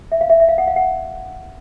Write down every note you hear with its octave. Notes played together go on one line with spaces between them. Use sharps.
E5
F5
E5
E5
F5
F#5
F5
F#5